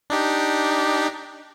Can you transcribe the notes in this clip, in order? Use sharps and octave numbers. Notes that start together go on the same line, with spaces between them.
D4 D#4 G4